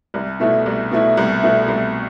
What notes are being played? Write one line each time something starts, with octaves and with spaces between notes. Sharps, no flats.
C2
B2 A3 E4
C2
B2 A3 E4
C2
B2 A3 E4
C2